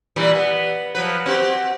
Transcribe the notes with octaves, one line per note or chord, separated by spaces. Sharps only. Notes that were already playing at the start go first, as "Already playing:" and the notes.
A#2 E3 G3
B3
F3 F#3 B4
C4 F#4 G4